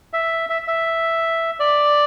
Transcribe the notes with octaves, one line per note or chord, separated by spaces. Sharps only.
E5
E5
E5
D5